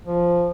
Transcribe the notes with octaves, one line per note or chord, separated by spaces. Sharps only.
F3